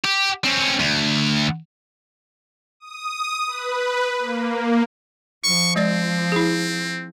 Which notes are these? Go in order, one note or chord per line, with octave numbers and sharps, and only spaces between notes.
G4
C4 C#4
D2
D#6
B4
A#3
F3 C#6
G#3 C4 D5
E4 G#4